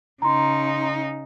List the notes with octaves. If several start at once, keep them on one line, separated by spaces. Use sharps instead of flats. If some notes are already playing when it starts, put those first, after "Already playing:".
C#3 D#4 A#5 C6